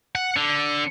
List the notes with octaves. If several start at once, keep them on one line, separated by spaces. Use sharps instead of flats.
F#5
D3